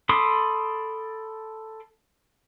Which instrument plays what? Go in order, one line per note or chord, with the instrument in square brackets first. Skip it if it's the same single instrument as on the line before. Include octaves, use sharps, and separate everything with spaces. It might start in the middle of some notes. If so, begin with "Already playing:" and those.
[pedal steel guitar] A4 B5 C6 D6 D#6